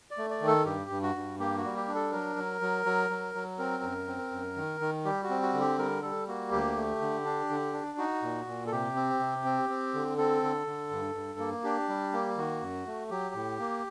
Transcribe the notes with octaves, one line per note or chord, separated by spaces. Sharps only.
D5
A3
D5
D#3
A4
G2 G4
G2
F#4
G2
A#3 G4
F#4
G3
G4
D4
A4
F#3 A#4
F#3
F#3
F#3
F#3
F#3
C4 A#4
F#2
C4
F#2
D#3
D#3
G3 G4
F#4
C4
F#4
D3
G4
G3 A#4
G3 A4
A#3 F#4
D2 G4
A3
D3
D4
D3
D4
D#4 F#4
A#2
A#2
A4
C3 G4
C4
C3
C4
C4
D3
C4 A4
D3
D3
G2
G2
A#3
D4 G4
G3
A#3
D#3 F#4
F#2
A3
F#3 G4
A2
A#3